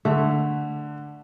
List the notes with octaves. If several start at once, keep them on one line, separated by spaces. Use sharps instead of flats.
D3 A3